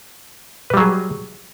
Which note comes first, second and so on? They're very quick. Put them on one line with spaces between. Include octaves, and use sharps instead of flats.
B4 G3 F#3 G#4